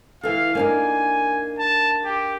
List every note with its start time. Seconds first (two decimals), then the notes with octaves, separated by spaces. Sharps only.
0.23 E3 A4 F5
0.55 A#3 D4 D#4 G#5
1.59 A5
2.05 G4